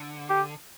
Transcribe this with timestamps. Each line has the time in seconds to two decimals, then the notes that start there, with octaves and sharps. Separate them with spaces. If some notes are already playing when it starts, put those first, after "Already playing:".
Already playing: D3
0.30 G4